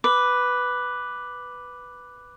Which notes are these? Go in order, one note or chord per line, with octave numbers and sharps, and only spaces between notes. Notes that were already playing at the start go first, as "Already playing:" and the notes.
B4 D6